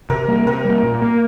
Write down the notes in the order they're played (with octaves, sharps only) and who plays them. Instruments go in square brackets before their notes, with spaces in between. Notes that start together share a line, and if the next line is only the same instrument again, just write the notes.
[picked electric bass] C3 [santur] A#4
[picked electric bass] G3 A#3
[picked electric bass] C3 [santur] A#4
[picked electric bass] G3 A#3
A#2
A#3